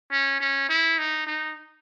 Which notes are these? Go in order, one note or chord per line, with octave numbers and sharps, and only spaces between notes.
C#4
C#4
E4
D#4
D#4